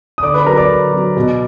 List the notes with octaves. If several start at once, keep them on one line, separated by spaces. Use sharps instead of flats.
D#6
D3 D5 D6
B4 B5
F#3 A#4 A#5
D5 D6
D3
F#3
B2